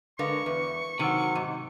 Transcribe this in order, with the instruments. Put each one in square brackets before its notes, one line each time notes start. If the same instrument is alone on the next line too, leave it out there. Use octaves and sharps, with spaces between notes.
[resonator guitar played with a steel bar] D3 G#3 A#4 [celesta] B4 F5 [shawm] C#6
[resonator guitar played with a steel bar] E2 [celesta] B4
[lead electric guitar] C3 F#3 [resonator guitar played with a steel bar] D#3 [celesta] F#5 E6 D#7
[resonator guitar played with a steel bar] G#2 [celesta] D#7